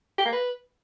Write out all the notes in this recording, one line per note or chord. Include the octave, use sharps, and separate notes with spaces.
G4
A#3
B4